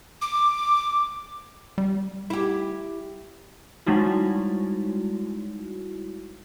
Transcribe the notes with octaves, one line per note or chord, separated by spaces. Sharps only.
D6
G3
E4 G4
G3 G#3 D#4 E4 F#4